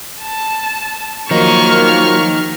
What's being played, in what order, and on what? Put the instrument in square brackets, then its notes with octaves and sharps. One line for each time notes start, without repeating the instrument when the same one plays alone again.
[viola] A5
[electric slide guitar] D#3 D#4 [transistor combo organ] F3 F#3 [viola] A#3 [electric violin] C#6 F6